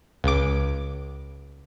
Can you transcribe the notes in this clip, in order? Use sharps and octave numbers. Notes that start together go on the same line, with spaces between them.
C#2 D6